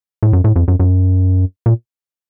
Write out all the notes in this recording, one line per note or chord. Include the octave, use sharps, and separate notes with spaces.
A2
F#2
A2
F2
F#2
F#2
A#2